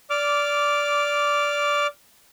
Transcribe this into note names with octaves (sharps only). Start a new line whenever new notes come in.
D5 D6 F6